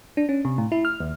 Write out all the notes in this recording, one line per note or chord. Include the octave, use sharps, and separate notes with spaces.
D4
C#4
C3
A2
E4
F6
D#2